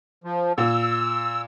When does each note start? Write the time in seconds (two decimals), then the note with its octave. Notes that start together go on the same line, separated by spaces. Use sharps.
0.24 F3
0.58 A#2 E6